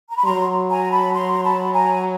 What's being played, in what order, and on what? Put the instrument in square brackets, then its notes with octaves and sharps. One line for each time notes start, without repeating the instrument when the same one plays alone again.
[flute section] A#5
B5
[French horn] F#3 [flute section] A#5 C6
[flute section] G#5 A#5
A5 B5
A#5 C6
A5 B5
G#5 A#5